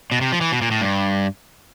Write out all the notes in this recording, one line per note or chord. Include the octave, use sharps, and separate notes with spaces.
B2
C3
F3
E3
B2
A#2
A2
G2